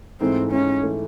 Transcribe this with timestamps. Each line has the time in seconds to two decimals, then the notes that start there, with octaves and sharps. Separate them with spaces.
0.20 G#2 E3 A3 C4
0.51 G#2 E3 A3 C#4
0.83 E3 A3